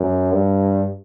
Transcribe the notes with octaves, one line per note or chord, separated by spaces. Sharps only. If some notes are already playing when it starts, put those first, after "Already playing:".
Already playing: F#2
G2